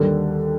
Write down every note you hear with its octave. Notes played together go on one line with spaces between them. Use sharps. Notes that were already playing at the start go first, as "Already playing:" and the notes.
Already playing: D#2 D3 G3